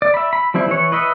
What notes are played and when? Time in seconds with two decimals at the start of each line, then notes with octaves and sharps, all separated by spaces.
0.02 D5
0.14 E5 B5
0.33 B5
0.54 F3 G3 C4 E4
0.68 E3 C#5
0.92 B4 D#5 E5